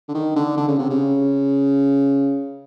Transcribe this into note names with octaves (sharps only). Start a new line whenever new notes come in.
D3
D#3
D3
D3
C#3
C3
C#3